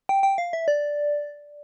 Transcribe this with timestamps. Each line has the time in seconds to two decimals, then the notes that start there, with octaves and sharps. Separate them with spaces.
0.09 G5
0.23 G5
0.38 F5
0.53 E5
0.68 D5